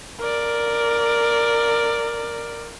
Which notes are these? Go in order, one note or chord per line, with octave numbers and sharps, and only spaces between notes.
A#4 D5